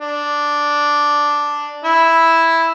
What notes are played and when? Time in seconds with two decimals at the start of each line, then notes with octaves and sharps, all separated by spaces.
0.01 D4
1.84 E4 E6